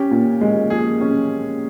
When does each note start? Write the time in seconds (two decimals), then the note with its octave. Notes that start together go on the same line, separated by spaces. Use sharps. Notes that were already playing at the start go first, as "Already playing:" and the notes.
Already playing: C#4 G4
0.11 A#2
0.41 G#3
0.70 F3 G#4
1.01 C#4